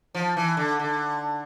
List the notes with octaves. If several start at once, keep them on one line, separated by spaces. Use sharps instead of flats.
F3
E3
D3
D3